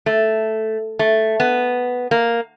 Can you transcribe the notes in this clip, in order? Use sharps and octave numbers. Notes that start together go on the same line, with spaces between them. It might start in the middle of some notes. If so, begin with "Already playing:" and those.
A3
A3
B3
A#3